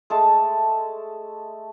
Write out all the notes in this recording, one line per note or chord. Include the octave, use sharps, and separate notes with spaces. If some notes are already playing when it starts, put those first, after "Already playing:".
G#3 A3 A5